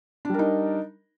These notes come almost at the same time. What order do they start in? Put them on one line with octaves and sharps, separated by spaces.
D4 G3 A#4 D#4